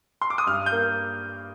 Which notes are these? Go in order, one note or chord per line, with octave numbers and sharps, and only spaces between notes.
C6
D6
D#6
G2 F6
G6
A#3